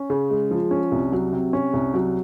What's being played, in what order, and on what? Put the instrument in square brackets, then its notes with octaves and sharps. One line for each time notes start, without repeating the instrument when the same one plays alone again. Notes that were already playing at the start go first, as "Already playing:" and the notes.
Already playing: [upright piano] C#4
C#3
G#3
F3
C#4
C2
F#3
C3
C#4
C2
F#3